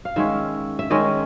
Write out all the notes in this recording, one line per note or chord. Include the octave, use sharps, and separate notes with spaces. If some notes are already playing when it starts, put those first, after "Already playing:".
F5
D#3 G#3 C#4 E5
E5
D#3 G#3 C#4 D#5